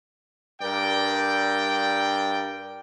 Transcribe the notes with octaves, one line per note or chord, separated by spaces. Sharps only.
G2 A#4 D5 G5